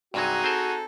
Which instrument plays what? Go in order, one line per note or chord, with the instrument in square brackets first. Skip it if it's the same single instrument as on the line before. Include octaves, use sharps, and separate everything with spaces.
[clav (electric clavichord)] G2 C3 F#3 [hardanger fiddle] D#4 G#4 [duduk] F#4
[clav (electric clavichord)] C4 C5 [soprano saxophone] A4